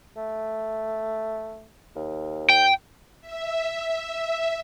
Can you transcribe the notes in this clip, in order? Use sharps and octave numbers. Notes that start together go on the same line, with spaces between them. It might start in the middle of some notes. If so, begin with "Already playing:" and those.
A3
D#2
G5
E5